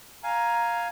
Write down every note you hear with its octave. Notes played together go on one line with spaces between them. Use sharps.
F5 G#5 A#5